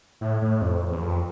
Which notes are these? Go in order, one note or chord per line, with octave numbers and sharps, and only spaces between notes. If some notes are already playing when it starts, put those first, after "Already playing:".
A2
A2
F2
E2
F2